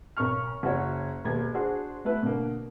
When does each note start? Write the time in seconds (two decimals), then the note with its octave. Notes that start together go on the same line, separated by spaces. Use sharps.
0.17 B1 A#4 C#6 F6
0.63 F#1 F#4 C#5
1.25 E1 D#2 A#4 G#6
1.54 D4 F#4 G#4 C5
2.04 A3 B3 E4 B4
2.23 B2 D3 A#3